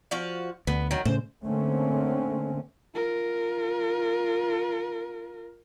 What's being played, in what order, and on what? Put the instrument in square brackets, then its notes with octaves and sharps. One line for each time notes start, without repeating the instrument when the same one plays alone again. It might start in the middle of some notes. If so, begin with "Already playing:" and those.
[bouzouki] F3 F#4 F5
[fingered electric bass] D2 [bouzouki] B3
[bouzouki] D#3 F#3
[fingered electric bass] A2 C#3 [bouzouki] C5
[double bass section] D3 A3 A#3 C4 C#4
[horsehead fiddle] F4 A#4